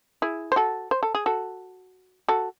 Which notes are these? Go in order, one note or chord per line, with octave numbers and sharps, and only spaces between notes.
E4 G#4
C5
F#4 A4
C5
A4
G#4
F#4 A4
F#4 A4